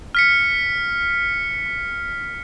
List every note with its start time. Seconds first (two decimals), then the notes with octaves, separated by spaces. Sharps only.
0.15 F6 B6 C#7